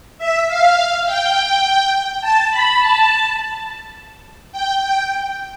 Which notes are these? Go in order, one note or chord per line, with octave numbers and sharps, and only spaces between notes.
E5
F5
G5
A5
B5
A5
G5
G5